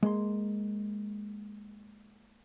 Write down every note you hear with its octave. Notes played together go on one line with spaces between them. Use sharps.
G#3 A#3 C6